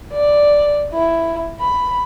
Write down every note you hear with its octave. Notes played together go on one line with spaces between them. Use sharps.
D5
E4
B5